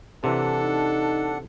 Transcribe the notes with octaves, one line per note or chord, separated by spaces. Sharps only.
C3 E3 D4 A4 F#5
D#4